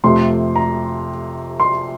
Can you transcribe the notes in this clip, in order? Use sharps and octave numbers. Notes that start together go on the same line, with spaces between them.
F2 C3 F3 A3 C6
A#5
C6